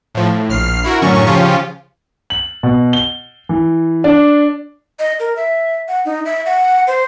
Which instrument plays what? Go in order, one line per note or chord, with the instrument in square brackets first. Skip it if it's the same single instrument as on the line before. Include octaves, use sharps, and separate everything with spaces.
[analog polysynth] A2 F3
A2
A#1 F6 C7
E4 F#4 A#4
F#2 A2 D3 F#3 C#4 C#6
C#3 F3 C#4 F4 G4
[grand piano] F#7
B2
G7
E3
D4
[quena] D#5
A#4
E5
F#5
D#4
E5
F#5
C5